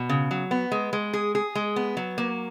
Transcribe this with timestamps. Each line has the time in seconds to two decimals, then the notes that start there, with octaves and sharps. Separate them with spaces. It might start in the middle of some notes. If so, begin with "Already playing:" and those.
Already playing: B2
0.09 C#3
0.31 F#3
0.51 B3
0.72 G#3
0.93 G#3
1.13 G#4
1.35 G#4
1.55 G#3
1.76 B3
1.97 F#3
2.18 A#3